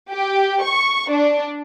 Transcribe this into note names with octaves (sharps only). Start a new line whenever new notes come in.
G4
C#6
D4